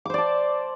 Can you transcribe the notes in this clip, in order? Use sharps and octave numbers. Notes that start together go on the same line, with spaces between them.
C5 D5 A5 D6